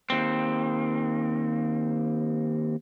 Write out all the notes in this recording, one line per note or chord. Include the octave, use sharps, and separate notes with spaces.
D#2 C4